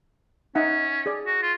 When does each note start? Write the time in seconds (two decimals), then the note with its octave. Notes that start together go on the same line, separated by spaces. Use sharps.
0.55 C#4 D#4 E5 F#5
1.06 G#4 D5
1.26 F#4
1.42 F4